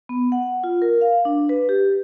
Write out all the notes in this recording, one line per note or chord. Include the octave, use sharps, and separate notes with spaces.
B3
F#5
F4
A#4
F5
D4
B4
G4